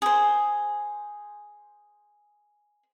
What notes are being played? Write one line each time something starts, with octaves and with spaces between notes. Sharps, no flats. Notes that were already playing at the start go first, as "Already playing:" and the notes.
G#4 C5